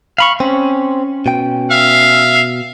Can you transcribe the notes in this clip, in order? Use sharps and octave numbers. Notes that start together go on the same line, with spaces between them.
F5 B5 C#6
C4 C#4
B2 G5
E5 F5